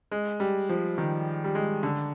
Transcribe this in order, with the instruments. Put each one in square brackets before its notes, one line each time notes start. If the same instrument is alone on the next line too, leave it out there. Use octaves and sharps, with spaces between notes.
[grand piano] G#3
G3
F3
D#3
G3
G#3
D3